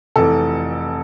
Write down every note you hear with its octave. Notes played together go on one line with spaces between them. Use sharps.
F1 F2 E3 A4